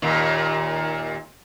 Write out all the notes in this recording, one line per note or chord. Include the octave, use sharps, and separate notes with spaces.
D#2 A#2